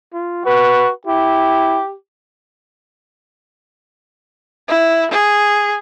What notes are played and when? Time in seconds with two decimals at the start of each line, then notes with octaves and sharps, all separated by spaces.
0.13 F4
0.46 F#4 B4
1.07 E4 G4
4.68 E4
5.11 G#4